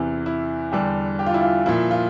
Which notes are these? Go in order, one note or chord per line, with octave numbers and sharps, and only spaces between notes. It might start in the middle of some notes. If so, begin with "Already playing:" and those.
Already playing: E2 C3 E3 E4
E4
E2 D3 G3 G4
G4
F4
E4
F4
A#2 F3 E4
F4